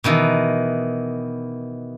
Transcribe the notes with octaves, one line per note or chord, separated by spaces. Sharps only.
B2 D#3 E3